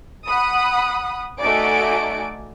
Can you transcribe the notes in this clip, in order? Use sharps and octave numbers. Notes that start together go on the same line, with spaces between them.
F#5 B5 D#6
A3 D#4 F#4 D5 G#5 D7